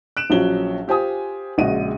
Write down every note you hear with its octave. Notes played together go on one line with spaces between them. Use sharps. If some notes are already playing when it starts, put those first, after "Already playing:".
F#6 D7 E7
A#1 F3 F#3 C#4 G7
F4 G4 C5 G#5 D#6
A#1 C#3 G#3 F#4 D#5 D#7